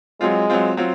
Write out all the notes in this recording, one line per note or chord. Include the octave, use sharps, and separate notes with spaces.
F#3 G#3 C4 F4
F#3 C4 F4
F#3 C4 F4